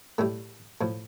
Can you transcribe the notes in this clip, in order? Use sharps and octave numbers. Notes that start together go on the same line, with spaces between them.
A2 G3 A3
A2 F3